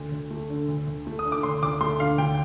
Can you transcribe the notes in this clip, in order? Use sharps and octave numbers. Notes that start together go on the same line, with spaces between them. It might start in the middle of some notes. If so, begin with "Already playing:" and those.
Already playing: D2
D2
A3
D3
D2
D2
A3
D#6
D3
D6
D2 C6
D2 D6
A3 C6
D3 F5
D2 G5